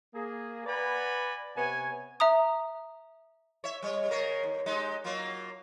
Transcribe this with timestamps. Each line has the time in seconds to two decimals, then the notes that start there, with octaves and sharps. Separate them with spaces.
0.15 A#3 G#4
0.66 B4 D5 F#5 G#5 A#5 B5
1.57 C3 B3 C#5 G#5
2.20 E5 A#5 D#6
3.64 C#5 E5
3.82 G3 C#5
4.09 C#3 A#4 C#5
4.43 D#2
4.66 G#3 D#4 G4
5.04 F#3 A#3 F4